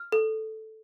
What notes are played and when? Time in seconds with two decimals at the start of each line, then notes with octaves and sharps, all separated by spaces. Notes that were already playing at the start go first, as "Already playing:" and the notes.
Already playing: F6
0.12 A4